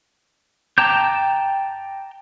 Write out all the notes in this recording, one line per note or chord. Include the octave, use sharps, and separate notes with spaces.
G5 A5 A#5 D6 G6